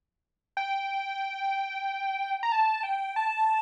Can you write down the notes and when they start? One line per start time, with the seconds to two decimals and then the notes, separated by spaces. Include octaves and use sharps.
0.57 G5
2.43 A#5
2.52 A5
2.83 G5
3.16 A5